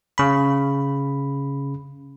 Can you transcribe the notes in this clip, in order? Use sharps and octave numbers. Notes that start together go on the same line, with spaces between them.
C#3 B5